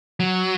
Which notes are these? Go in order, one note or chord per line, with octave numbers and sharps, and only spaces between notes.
F#3